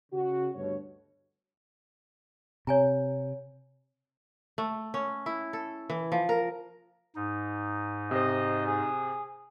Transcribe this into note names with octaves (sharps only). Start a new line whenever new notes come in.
C#3 F#4
D2 G2 B2 C#5
C3 C#5 G#5 A#5
A3
C#4
E4
A4
E3
F3
A#4
G#2 D#4
C3 C5 D#5
G#4